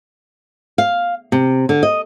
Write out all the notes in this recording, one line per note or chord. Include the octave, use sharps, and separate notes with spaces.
F5
C3
D3
D#5